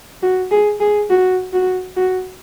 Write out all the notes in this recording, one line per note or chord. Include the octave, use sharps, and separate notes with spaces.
F#4
G#4
G#4
F#4
F#4
F#4